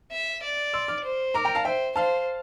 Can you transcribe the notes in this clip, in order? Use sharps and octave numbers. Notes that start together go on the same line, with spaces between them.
E5
D5
C6 E6
D6 F6
C5
A#4 A#5 D6
G5 A#5
F5 A5
C5 E5 G5
C5 F5 A5